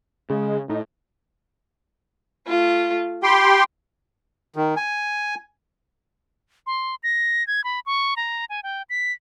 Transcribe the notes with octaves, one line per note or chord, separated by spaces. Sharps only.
C#3 G#3
A2 D#4
A3 F4
G4 G5 B5 C6
D#3
G#5
C6
A#6
G#6
B5
C#6
A#5
G#5
G5
B6